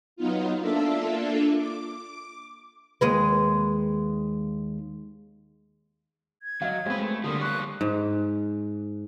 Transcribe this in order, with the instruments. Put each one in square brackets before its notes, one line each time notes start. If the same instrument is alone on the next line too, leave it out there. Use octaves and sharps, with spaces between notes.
[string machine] F#3 B3 D#4 F4
A#3 D4 F4 A4 E5
D6
[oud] D#2 G#3 B4
[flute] G#6
[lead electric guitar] F#3 [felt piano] D#5 F5
[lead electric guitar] F2 B4 [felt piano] G#3 B3 C4
[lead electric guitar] A3
[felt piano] D3 A#3 [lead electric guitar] F3 G3 [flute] D#6
[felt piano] C#6 [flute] F#6
[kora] G#2